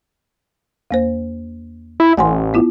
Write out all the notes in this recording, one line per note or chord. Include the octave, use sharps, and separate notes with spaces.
E2 A#3 C5
E4
A1 F#5 G#5 C6
B3 E4 F4